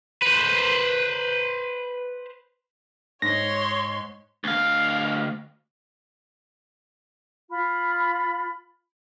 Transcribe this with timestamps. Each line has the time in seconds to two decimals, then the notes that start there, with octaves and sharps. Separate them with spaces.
0.22 B4 C5
3.22 G#2 C#5 C6 A#6
4.44 D2 F5
7.50 F4 B5